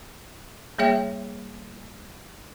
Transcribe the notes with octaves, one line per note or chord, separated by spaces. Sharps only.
G3 A#3 G#4 C#5 E5 G5